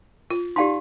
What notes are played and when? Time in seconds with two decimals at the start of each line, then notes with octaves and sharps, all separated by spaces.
0.30 F4
0.56 D#4 G4 D5 F5 A5 C6